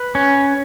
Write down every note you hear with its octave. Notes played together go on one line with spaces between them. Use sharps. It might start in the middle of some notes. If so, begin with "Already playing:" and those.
Already playing: B4
C#4